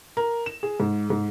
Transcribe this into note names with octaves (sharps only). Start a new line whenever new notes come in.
A#4
E7
G#4
G#2
G#2